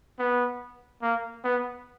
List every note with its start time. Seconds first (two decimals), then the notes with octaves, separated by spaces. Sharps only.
0.19 B3
1.02 A#3
1.44 B3